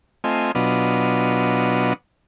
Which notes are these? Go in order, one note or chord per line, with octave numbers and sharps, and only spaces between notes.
A3 C4 F4 D#5 G#5
B2 F#3 B3 D4 F4 D#5